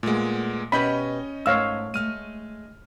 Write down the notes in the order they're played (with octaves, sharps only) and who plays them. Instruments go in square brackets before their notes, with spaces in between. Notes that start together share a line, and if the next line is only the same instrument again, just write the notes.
[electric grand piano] A#2 G#3 [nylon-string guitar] A3 B3
[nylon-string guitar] B2 G4 B4 [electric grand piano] C#4 D#5 G6 [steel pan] B5
[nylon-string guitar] G#2 A3 [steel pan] C#5 F5 E6
[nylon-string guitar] G#3 A3 [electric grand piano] F6 D#7